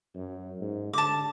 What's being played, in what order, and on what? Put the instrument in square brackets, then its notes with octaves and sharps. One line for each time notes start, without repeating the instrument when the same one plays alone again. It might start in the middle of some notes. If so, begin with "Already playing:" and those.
[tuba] F#2
G#2
[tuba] D3 [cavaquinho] A5 D6